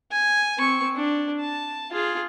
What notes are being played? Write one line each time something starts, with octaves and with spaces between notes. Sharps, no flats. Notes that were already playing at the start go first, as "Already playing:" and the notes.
G#5
C4 C#6
D4
A5
F4 G#4